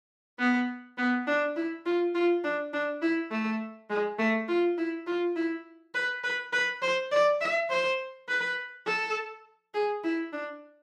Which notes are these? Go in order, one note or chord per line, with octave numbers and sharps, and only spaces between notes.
B3
B3
D4
E4
F4
F4
D4
D4
E4
A3
G#3
A3
F4
E4
F4
E4
B4
B4
B4
C5
D5
E5
C5
B4
A4
G#4
E4
D4